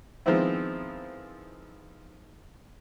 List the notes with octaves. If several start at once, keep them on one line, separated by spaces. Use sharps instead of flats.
D#3 F3 G#3 B3 C4 E4